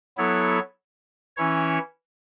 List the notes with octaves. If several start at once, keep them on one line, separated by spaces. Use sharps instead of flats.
F#3 B3 E4 A4 C#5
E3 C#4 E4 C#5